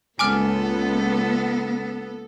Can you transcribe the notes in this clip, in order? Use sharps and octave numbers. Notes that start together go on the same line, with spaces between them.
C#2 A#3 B3 A4 G#5 D6 F6